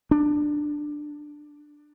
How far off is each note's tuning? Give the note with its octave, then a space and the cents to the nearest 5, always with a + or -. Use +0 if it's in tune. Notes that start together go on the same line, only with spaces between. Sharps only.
D4 +10